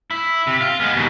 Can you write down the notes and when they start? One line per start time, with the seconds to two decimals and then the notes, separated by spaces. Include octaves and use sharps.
0.10 E4
0.47 C3
0.61 F4
0.80 G#3 B3
0.93 D#2 B2